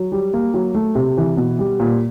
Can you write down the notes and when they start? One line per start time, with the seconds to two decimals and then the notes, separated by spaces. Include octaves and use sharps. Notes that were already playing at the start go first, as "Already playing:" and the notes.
Already playing: F#3
0.12 G3
0.34 A#3
0.54 F#3
0.75 A3
0.95 C3
1.17 E3
1.37 B2
1.59 G3
1.80 A#2